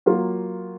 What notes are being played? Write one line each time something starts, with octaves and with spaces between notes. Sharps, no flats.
F#3 A#3 F4